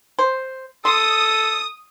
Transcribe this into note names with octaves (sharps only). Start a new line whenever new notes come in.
C5
A4 C6 D#6